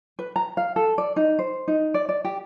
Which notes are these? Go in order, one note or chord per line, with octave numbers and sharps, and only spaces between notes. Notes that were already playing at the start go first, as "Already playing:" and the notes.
B4
A#5
F5
A4
D5
D#4
C5
D#4
D5
D5
G4